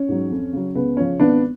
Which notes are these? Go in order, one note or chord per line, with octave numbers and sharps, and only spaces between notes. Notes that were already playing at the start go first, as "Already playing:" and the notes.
Already playing: C#4
G#2 F#3
F2
C#3 F#3
C#2 B3
C#3 F3 C#4
G#1 B3 D4